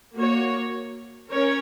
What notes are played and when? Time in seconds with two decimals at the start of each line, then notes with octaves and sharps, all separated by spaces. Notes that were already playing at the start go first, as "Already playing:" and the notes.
0.14 A#3 F#4 C#5
1.29 C#4 A#4 C#5